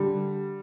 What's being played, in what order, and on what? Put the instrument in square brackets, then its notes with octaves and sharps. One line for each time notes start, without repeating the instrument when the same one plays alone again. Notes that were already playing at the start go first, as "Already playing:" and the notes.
Already playing: [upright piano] D3 G3